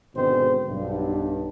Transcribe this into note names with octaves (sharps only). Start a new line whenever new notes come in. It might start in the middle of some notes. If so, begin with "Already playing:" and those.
G#1 B2 D3 G#3 C4 C5
B1 G2